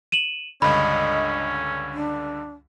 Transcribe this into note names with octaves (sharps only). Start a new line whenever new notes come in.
D#7 E7 F#7
C#2 G2 D3 C#4 D#5 B5
D4